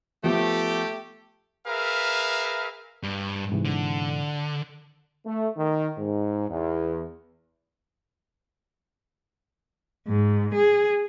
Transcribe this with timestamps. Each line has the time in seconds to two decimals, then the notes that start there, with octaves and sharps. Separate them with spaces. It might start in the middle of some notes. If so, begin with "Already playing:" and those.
0.24 F3 A3 B3 G4
1.67 G#4 A#4 B4 E5 F5
3.03 G2
3.52 G#2 C3 E3
3.65 D3
5.26 A3
5.57 D#3
5.97 G#2
6.49 E2
10.07 G#2
10.55 G#4